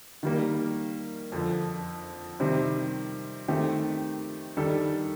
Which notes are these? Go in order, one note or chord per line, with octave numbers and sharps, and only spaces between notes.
D#3 G3 A#3
F2 D3 F3
C3 D#3 G3 C4
D#3 A3 C4 G4
D#3 G3 D4 A4